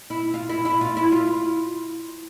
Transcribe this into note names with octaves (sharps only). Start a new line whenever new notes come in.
E4
F4
E4
E4
F4
E4
F4